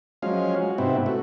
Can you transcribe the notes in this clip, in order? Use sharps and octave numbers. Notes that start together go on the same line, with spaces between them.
F3 F#3 G#3 C#4 F5
F#4
G#2 C3 B3 C4 E4
A3 F#4